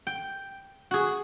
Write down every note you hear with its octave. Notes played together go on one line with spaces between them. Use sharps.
G5
F#4 G#4